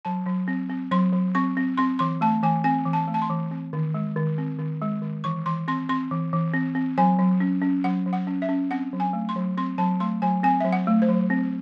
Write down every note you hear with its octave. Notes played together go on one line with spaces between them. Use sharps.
F#3 A5
F#3
C4
C4
F#3 C6
F#3
C4 C#6
C4
C4 C6
E3 C6
A3 A5
E3 G#5
C4 G#5
E3
A5
A3
A5
C6
E3
C4
D#3
G#3
D#3
C4
D#3
G#3
D#3
E3 C#6
E3 C6
C4 C6
C4 C6
E3
E3
C4
C4
F#3 G#5
F#3
C#4
C#4
F#3 F#5
F#3
F#5
C#4
E5
C#4
C4 F#5
F#3
G#5
A3
C6
F#3
C4 C6
F#3 A5
A3 C6
F#3 G#5
C4 G#5
F#3 E5
F#5
A3
C5
F#3
C4